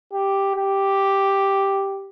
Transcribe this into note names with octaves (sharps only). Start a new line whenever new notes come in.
G4
G4